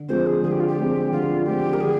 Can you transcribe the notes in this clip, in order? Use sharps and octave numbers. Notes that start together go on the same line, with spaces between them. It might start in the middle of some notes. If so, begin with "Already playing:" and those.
Already playing: D3
F3 G#3 C4 C5
G#4
D3 G#4
G4
F4
G4
F3 G#3 C4
D3 F4
F3 G#3 C4 G4
A#4
D3 G#4